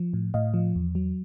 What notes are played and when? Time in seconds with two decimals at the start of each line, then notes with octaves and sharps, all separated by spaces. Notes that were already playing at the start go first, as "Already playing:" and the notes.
Already playing: F3
0.14 A2
0.34 A2 D#5 F5
0.54 F3
0.76 E2
0.95 F#3